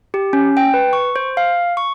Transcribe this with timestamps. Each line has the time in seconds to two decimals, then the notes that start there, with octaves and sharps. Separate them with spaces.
0.14 G4
0.33 C#4
0.57 G5
0.74 B4
0.93 C#6
1.16 C5
1.37 F5
1.77 C#6